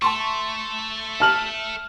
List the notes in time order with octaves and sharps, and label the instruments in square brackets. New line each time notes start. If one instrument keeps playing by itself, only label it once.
[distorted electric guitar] A3 [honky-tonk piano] A5 C6 C#6
[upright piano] A5 F6 F#7